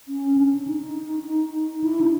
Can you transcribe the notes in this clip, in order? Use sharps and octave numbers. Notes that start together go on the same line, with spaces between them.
C#4
D4
D#4
E4
D4